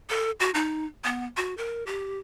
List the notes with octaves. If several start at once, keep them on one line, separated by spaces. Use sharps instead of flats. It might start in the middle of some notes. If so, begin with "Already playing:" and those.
A4
F#4
D#4
B3
F#4
A#4
G4